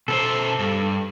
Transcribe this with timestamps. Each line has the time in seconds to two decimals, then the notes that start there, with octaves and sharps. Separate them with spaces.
0.08 B2 A4 B4 C5
0.59 G2